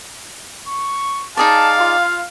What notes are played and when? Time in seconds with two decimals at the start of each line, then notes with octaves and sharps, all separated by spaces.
0.68 C#6
1.37 D#4 G#4 D5 F5 A5
1.79 F4